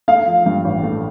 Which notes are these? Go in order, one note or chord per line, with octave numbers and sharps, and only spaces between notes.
A3 F5
F3
G2
A1
A3